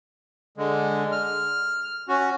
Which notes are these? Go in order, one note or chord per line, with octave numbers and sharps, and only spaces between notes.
D3 G#3
F6
C#4 F#4